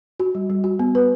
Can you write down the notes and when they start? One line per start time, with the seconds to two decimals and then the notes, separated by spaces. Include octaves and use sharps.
0.20 F#4
0.35 G3
0.50 G3
0.64 F#4
0.79 B3
0.95 B4